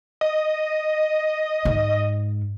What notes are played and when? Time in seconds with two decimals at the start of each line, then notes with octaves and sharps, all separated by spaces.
0.21 D#5
1.65 G#2